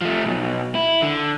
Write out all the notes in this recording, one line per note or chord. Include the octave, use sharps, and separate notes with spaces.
F3 A3
B1 B2
E4
D3